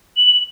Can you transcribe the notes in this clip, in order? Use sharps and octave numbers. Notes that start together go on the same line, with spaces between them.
F#7